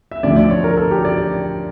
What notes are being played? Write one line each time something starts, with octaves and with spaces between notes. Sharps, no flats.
E5
D2 D3 F3 D5
D5
C#5
A#4
A4
G4
D5